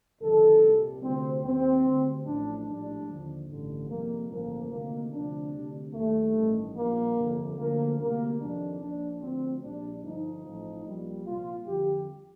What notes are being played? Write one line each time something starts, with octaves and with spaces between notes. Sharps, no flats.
G1 F2 C3 D#3 A4
C2 A#2 G3
D2 C3 G3 C4
D#2 D#3 G3 C4
D2 D3 G3
A1 A2 F3 D4
A#1 A2 G3 D4
D#2 D3 F3
A1 G2 D3
F2 C3 D#3 G3 A#3
A1 G2 D3 F3 A#3
D2 C3 D#3 A#3
D2 C3 F3 D4
D2 C3 G3
D#2 D#3 G3 A3
A1 G2 D#3
A#1 A#2 G3 A#3
G1 F2 C3 F3
D2 D3 F3 A#3
D2 C3 G3 A#3
F2 C3 D#3 D4
A#1 A#2 F3 D4
D2 D3 F3 C4
A#1 A#2 G3 D4
G1 G2 D3 F3 D#4
A1 A2 F3
A#1 A#2 G3
C2 A#2 F3 F4
F2 D3 G3 G4